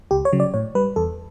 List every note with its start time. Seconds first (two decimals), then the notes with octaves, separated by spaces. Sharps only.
0.11 C#2 G4
0.25 C#5
0.33 C#3 F#3
0.40 D5
0.54 A2 C#5
0.75 G3 B4
0.96 E2 A4